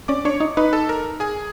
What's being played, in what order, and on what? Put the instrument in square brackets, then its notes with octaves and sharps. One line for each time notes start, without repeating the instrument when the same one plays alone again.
[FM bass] C#4 [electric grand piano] D5 D6
[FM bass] D4 [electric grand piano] C#5 C#6
[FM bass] D#4
[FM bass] D#4 [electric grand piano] B4 B5
[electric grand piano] A4 A5
A#4 A#5
G#4 G#5